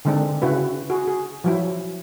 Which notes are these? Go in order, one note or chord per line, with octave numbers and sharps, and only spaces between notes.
D3 D#3 G#3 C4 D4
C#3 E4 F#4 B4
F#4 G#4
G#4
F3 F#3 E4